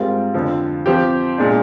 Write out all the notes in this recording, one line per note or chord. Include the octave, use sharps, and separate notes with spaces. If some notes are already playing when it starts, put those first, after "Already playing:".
Already playing: G#2 G3 C4 F4 A#4
F2 D3 F3
F3 C4 G4
A#2 G#3 D4